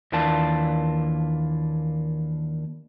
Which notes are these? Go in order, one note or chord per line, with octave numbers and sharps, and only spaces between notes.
D#2 E3 A#3 D4 F4 A5